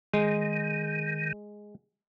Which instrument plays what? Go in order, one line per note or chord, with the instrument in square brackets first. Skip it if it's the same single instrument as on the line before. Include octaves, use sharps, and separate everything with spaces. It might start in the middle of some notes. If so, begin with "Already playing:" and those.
[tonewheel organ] D#3 [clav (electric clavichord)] G#3